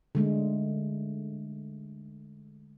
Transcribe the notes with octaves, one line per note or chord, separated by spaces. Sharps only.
D3 G#3 A3